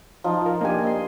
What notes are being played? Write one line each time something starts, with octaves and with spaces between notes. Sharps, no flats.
F3 D#4
F4 A#4
A#3 D4 D#4 G4 G#5
D#5 C6